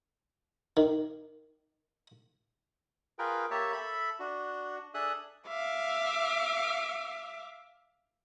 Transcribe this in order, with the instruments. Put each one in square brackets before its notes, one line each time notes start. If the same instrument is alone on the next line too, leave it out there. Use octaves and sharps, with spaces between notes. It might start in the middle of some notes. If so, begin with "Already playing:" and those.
[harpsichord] D#3
[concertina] F4 G#4 A#4 B4 G5
A#3 G4 C#5 E5 A5
A4 E5 B5
D4 F#4
D4 G#4 A4 E5 D#6 F#6
[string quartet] E5 F5 D6